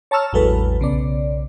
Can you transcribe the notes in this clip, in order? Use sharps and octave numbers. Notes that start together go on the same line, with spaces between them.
C#5 A5 A#5 C#6 E6 F6
A1 E2 F#3 G#3 A4 B4
B1 C#3 B3 D5